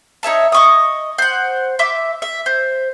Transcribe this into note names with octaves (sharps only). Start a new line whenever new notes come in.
D#4 C#5 E5 A5
D#5 C#6 D#6
C5 F#5
E5 C6 D6 E6
E5
C5